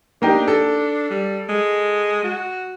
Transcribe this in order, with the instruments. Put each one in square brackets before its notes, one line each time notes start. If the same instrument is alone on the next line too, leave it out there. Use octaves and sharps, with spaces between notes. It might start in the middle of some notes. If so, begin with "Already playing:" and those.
[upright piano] A#3 D#4 G4 [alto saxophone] D4
[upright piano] A4
[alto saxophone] G3
G#3
F#4